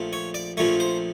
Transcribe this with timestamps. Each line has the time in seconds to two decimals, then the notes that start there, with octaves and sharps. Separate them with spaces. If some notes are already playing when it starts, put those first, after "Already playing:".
Already playing: A#1 A#2 F3 A3
0.13 C#5
0.34 D5
0.57 A#1 A#2 F3 A3 C#5
0.80 C5